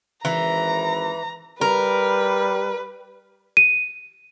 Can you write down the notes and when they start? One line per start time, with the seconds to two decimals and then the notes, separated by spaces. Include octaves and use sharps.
0.25 G#1 E3 A#5
1.61 G3 A#4 B4
3.57 D#7